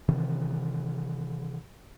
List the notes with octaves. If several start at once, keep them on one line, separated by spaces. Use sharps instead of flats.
C3 D#3 E3